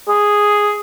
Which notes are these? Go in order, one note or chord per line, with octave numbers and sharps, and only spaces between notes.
G#4